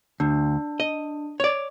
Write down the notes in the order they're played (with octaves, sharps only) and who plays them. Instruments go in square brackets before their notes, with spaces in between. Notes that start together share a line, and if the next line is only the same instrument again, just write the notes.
[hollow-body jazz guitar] D2 [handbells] D4
[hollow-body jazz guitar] D#5
C#5 D5